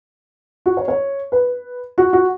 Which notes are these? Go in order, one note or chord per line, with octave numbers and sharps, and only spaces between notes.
F#4
C#5
C#5
B4
F#4
F#4